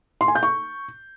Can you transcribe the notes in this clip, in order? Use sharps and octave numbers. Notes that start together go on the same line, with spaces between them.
C6
G#5
G6
C#6